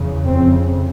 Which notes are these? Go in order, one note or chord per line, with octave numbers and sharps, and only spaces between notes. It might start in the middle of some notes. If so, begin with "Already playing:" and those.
Already playing: E2 C#3
F2 C#3 C4